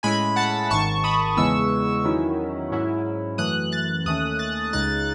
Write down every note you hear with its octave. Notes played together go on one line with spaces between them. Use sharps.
A2 G#3 C#4 E4 G#5 B5
F#5 A5
G#1 G#2 D#3 A5 C#6
B5 D#6
E2 C#3 E3 G#3 B3 C#6 E6
E2 D#3 F#3 C#4 E4
G#2 F#3 C#4 E4
F#2 E3 A3 D#6 F#6
F#6 A6
D#2 D#3 A3 C#4 D#6 F#6
F#6 A6
C#2 C#3 G#3 D#4 F#6 A6